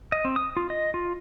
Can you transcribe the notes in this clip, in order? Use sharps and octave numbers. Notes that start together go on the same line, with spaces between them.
D#5
C4
D#6
F4
D#5
F4